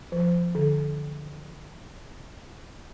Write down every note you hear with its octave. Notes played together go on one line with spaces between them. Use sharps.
F3
D3